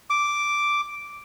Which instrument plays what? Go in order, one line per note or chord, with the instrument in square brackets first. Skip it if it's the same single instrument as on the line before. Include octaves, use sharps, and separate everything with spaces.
[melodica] D6